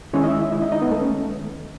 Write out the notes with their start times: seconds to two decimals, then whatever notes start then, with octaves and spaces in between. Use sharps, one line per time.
0.13 D#3 G#3 C#4 E4 C#5
0.24 D#5
0.28 E4 E5
0.52 E4 E5
0.62 D#4 D#5
0.72 D#4 D#5
0.82 B3 B4
0.92 A3 A4
1.00 C#4